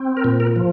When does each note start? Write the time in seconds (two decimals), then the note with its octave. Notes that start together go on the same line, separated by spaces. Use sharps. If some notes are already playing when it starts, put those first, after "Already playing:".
Already playing: C4
0.17 A#4
0.24 A#2
0.40 A#4
0.56 F3